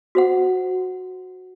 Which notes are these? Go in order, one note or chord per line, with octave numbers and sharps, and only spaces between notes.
F#4 C5 F#5